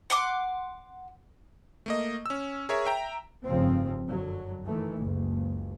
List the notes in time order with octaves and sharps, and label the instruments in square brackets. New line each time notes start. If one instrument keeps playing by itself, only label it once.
[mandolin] F#5 C6 D6
[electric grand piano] A3 A#3 D#5
C#4 E6
G#4 A#4 C#5 E5
E5 G5 A#5
[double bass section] F1 G2 C#3 F3 C4
F#2 D3 F#3
D#3 E3 A3
F#1 C#2